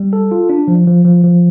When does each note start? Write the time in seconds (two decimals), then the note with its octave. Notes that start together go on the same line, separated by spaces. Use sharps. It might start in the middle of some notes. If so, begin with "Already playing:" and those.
Already playing: G3
0.13 A4
0.32 F4
0.49 D4
0.68 F3
0.87 F3
1.05 F3
1.24 F3